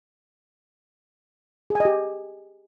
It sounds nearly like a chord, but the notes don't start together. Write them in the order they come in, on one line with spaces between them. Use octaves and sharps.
G#4 G#5 D#5 G4